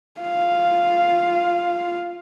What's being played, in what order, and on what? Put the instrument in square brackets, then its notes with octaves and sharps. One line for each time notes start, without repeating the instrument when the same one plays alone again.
[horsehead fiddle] F4 F5